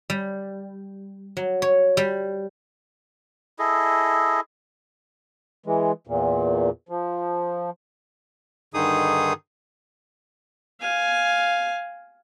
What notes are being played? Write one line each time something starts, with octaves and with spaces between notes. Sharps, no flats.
G3
F#3
C#5
G3
E4 G#4 A4 D#5
E3 G#3
E2 A#2
F3
G2 D3 D#3 D#4 G#4 D#6
F5 G#5